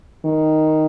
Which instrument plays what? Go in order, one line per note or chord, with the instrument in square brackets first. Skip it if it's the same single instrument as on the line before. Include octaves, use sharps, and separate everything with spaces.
[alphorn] D#3